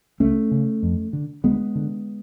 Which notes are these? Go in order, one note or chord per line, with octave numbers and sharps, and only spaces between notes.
C#2 A3 C#4
C#3
F2
D3
D2 G#3 B3
D3